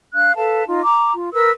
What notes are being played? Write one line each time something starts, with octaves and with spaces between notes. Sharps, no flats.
D4 F5 F#6
A4 B4 F5 A5
D#4 F4
A#5 D6
F4
A#4 B4 E6